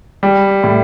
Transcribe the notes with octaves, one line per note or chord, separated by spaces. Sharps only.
G3
A2